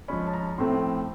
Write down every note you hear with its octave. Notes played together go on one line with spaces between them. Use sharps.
F3 G#3 C#4 B5
A5
A#5
A2 F3 A3 C4 C6